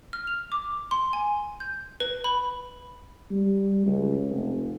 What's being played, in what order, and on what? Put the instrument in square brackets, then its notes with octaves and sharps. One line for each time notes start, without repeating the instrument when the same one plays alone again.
[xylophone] F6
F7
D6
C6
G#5
G6
B4
B5
[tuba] G3
C#2
F1